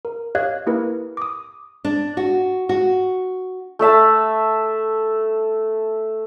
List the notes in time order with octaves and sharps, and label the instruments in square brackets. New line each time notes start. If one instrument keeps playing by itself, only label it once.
[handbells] A#4
G4 C#5 D#5 F5 F#6 G#6
A#3 E4 G4 A#4 B4
D6 D#6
[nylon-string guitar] D4
F#4
F#4
[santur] A3 A4 E5 A5